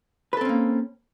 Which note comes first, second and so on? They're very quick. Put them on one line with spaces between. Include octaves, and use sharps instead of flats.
B4 A4 C4 C#4 A#3